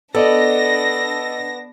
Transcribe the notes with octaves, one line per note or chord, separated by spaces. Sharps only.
B3 D4 A4 D5 D#5 A#6